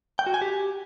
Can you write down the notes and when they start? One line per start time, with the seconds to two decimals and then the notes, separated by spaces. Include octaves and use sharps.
0.19 G5
0.26 F#4
0.34 G#5
0.41 G4